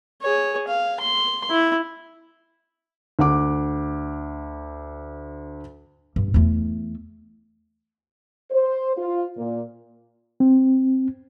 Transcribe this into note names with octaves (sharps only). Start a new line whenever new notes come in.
G#4 C#5
F5
C6
E4
D2 F#5 D6
G2
E2 A3
C5
F4
A#2
C4